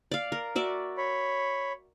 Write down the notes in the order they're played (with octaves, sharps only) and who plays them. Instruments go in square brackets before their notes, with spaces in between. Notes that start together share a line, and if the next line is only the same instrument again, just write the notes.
[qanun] D5 F5
A#4
F#4 D5 E5
[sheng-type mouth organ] C#5 B5